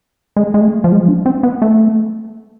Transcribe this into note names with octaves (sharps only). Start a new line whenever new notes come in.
G#3
G#3
A3
F3
G#3
F3
D4
C4
B3
A3